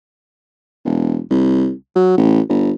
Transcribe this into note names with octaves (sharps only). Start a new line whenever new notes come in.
E1
C2
F#3
A1
G1